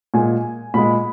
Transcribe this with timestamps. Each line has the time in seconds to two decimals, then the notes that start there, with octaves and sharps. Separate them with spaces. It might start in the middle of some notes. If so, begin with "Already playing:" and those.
0.14 A#2 G#3 G#5
0.74 A#2 G#3 B5